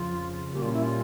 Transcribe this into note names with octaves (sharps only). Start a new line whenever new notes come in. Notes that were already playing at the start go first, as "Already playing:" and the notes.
Already playing: F2 C#3 F3 F4
A#2 G3 A#3 C#4 G4
F4
E4
F4